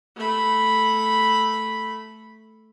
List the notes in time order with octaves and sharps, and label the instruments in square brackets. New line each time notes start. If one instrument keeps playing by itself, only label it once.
[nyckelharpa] A3 B5